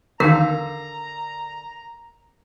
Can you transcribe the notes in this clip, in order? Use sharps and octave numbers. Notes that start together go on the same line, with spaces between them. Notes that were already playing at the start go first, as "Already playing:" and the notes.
E2 D3 D#3 A#4 F5 A#5